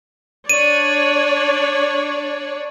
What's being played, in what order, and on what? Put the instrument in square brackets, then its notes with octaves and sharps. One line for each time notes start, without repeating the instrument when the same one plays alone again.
[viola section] D4 C#5 D5 [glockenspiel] D#7